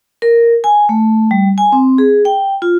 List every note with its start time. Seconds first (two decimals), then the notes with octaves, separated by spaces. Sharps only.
0.22 A#4
0.64 G#5
0.89 A3
1.31 G3
1.58 G#5
1.72 C4
1.98 G#4
2.25 G5
2.62 F4